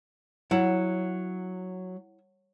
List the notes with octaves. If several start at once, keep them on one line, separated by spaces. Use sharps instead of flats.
F#3 E4 F#5